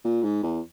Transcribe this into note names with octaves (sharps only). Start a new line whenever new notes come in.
A#2
G#2
E2